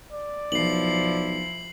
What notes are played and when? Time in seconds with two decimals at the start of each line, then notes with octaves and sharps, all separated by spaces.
0.12 D5
0.52 B1 F3 E4 C7 F#7